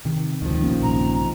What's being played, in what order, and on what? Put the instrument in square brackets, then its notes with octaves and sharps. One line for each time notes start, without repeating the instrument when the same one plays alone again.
[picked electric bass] C3 [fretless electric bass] D#3
[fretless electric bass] D2 G#2 [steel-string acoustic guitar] D#3 F3
[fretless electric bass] A#1 A#3 C#4
[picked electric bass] G2 C3 [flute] A#5